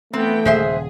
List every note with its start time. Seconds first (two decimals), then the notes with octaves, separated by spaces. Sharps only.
0.13 E3 A3 B3 C4 G5
0.45 D#1 C#3 G#3 G#4 C5 E5